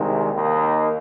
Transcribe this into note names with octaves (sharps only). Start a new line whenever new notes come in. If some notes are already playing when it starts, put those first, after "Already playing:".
Already playing: C2 C3 D#3 G#3
D#2 D#3 A#3 D#4